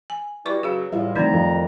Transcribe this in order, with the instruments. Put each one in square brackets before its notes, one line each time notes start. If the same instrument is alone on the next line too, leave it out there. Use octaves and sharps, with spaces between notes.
[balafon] G#5
[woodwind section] G3 E4 F#4 [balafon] B4 C#6 D6
[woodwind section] C#3 F#3 [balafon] F#4 G#4 F5
[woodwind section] E2 A2 [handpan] G3 E4 F4 [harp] E5
[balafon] D3 A3 D#4 [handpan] D#3 F3 C4 [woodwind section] D5 A#5
[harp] F2